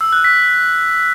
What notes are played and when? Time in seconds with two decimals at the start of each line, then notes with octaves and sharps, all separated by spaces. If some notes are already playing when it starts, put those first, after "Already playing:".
0.01 E6
0.13 F#6
0.24 B6